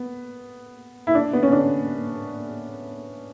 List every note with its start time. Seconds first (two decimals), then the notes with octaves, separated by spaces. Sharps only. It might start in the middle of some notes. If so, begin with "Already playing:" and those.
Already playing: B3
1.07 E4
1.15 D4
1.33 B3
1.43 C#4
1.52 D4